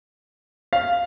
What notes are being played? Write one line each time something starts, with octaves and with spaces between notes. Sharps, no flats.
F5